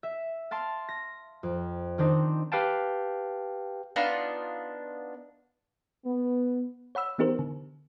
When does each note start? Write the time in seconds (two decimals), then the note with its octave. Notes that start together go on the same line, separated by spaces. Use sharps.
0.03 E5
0.51 F5 A5 C6 D7
0.89 A#6
1.43 F2
1.98 D#3 C4 D4 D#4
2.52 G4 B4 F5 G5 A5
3.96 B3 D4 D#4 F4
6.04 B3
6.95 C#5 F#5 B5 E6
7.18 E3 B3 D#4 G4 A#4 C5
7.39 D3